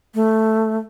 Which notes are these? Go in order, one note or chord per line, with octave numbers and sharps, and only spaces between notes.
A3